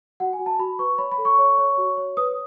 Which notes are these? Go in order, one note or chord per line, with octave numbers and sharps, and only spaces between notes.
F#4 F#5
G#5
F#4
A5
F#4 B5
B4 C#6
C#5 B5
B5
A4
C#6
C#5
C#5
F#4
C#5
B4 D#6